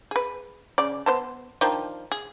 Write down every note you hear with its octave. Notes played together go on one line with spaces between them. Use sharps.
G#4 B4
C#3 D5
B3 C5 A5
D#3 F3 D4
G#4